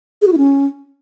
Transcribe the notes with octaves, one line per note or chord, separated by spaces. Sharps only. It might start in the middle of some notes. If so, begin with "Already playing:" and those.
G#4
F#4
E4
C#4